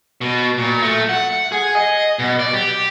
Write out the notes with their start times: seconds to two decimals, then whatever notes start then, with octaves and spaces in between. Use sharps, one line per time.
0.21 B2
0.58 A#2
0.82 A3
1.09 F#5
1.52 G#4
1.75 D#5
2.19 B2
2.39 D5
2.53 G4